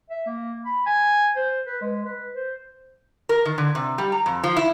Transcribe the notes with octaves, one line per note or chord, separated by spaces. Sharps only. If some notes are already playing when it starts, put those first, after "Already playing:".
E5
A#3
B5
G#5
C5
B4
G#3
B4
C5
A#4
D#3
D3
C3
G3
A#5
F2
F3
E4